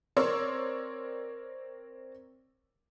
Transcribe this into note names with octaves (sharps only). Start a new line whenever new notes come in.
C4 A#4 C#5 D5 C6 E6